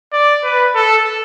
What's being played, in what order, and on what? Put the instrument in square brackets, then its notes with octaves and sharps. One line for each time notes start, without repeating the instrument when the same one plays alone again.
[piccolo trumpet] D5
B4
A4